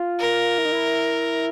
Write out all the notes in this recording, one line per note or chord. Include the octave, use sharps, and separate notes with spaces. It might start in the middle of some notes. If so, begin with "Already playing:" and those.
Already playing: F4
A#4
E4
D#4
E4